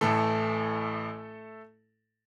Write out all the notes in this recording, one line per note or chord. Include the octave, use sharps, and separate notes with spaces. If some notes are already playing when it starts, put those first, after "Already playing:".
A1 A2 E3 A3 A4